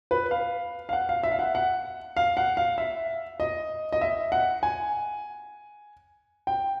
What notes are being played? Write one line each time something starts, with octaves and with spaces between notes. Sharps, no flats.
B4
F5
F5
F#5
F5
E5
F5
F#5
F#5
F5
F#5
F5
E5
D#5
D#5
E5
F#5
G#5
G5